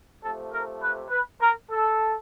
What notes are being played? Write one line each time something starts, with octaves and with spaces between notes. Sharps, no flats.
C3 F3 A3 A4
A#4
B4
B4
A#4
A4